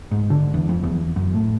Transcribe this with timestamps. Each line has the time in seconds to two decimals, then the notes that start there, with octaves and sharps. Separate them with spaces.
0.11 G#2
0.30 D3
0.54 E2
0.69 F2
0.84 E2
1.16 F#2
1.34 A2